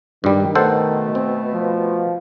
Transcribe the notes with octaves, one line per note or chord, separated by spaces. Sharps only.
G2 D#3 G3
B2 A3 A4 C5 F#5
C4
F3